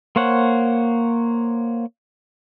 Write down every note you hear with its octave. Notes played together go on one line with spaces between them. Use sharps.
A#3 C5 C#5 F#5